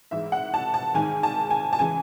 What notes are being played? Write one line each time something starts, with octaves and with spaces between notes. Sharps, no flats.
G#2 E3 G#3 E5
F#5
A5
A5
G#2 D#3 G#3 G#5
A5
G#5
A5
C#3 E3 G#3 G#5